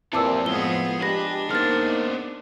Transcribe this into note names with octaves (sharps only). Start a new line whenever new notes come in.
A#2 E3 G3 C4 A4 A5 D6 E6
A2 F3 G#3 B3 G#4 G7
G#3 D4 G4 B4 A#6
A#3 B3 D#4 G#4 C5 F6 A6